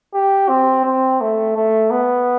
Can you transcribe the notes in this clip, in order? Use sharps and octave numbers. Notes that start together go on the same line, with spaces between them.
G4
C4
C4
A3
A3
B3